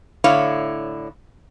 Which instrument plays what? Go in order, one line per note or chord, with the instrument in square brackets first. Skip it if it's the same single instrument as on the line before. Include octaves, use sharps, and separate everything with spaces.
[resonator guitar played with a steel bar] A2 D3 E4 C#5 F5